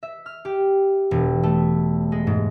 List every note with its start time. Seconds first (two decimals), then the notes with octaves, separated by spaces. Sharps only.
0.03 E5
0.26 F6
0.45 G4
1.11 E1
1.43 A3
2.12 G#3
2.27 G#2